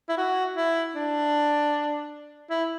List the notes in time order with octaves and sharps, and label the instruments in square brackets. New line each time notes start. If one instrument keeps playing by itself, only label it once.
[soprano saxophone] E4
F#4
E4
D4
E4